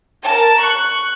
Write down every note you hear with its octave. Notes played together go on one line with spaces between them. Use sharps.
A#4 A5
C#6 F#6